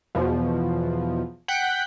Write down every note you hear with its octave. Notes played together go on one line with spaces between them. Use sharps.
E2 B2 F3
F#5 G5 F#6 G6 B6